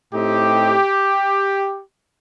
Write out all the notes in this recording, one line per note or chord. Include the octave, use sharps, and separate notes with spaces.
A2 A3 C4 D#4 G4